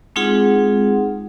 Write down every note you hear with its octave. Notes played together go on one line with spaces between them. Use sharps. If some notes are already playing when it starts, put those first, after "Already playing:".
G#3 C4 D#4 F4 G#4 F#5